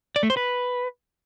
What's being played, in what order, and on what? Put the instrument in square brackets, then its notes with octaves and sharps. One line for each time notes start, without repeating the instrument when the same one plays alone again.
[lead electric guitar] D5
A3
C5
B4